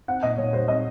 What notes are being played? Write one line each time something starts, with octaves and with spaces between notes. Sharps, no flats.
C4 F#5
A#2 D#5
A#2 C#5
G3 C5
C4 D#5